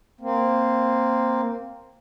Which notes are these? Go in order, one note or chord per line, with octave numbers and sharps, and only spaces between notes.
A#3 C4